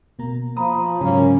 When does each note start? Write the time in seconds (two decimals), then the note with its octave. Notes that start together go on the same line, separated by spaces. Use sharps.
0.19 B2 A#3 A#5
0.57 F3 A#5 B5 D#6
1.01 G#2 C#3 F#3 A#3 C#4